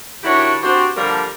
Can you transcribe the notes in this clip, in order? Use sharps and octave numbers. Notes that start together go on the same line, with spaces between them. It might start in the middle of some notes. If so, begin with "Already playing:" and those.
D#3 D4 E4 F#4 G4 C#5
C4 D4 F#4 G4 C5
D3 F3 G3 A#3 A#4